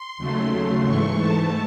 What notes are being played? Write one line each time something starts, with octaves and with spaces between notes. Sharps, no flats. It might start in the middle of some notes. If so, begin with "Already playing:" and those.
Already playing: C6
D#2 C#3 F#3 A3
C6
G#2 E3 A3 C#6
A5